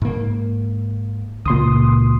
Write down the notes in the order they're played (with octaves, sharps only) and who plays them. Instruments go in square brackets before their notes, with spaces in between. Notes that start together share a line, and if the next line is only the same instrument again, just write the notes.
[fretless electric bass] G#2 A#3
[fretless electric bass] C#2 [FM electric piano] A#2 C6 D#6